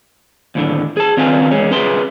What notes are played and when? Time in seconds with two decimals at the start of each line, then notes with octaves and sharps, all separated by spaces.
0.55 D#2 A2 D3
0.97 G#4 A5
1.17 D#3 C4 C#4 F4 B4 G#5
1.51 E2 G#3 C#4
1.71 C#4 G#4 B4 E5 C6